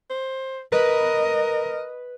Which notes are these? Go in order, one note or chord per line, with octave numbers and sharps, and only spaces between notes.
C5
A#4 B4 D#5